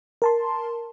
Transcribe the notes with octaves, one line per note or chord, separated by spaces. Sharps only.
A#4 A5 C6